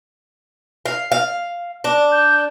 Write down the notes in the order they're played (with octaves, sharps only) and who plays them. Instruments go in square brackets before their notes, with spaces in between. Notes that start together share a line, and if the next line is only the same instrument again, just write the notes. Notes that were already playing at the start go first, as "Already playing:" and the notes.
[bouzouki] F5
F5
D4
[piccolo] G6